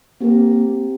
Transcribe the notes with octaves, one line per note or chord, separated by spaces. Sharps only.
A#3 C4 G4 A#4